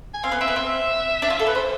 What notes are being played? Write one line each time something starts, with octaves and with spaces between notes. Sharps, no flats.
G#5
C4 F5
B3
C4 E5
B3
C4 E5
D4
F4
A4
B4
C5